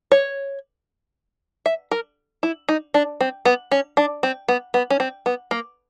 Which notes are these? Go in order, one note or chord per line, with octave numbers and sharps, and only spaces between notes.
C#5
E5
A#4
E4
D#4
D4
C4
B3
C#4
D4
C4
B3
B3
C#4
C4
B3
A#3